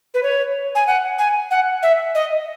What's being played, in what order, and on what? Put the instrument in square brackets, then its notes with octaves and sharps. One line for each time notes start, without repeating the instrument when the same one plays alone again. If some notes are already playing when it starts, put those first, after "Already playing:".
[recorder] B4
C#5
G#5
F#5
G#5
F#5
E5
D#5